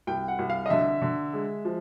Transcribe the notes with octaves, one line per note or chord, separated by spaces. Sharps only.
C2 G5
F#5
C2
F5
D#5
D3 E5
D3
G#3
F3